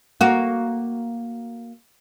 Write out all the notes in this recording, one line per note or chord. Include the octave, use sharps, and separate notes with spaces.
A#3 F#4